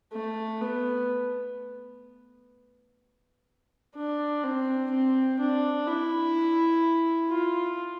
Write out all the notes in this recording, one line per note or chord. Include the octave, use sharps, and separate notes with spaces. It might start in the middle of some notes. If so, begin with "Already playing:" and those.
A3
B3
D4
C4
C4
D4
E4
F4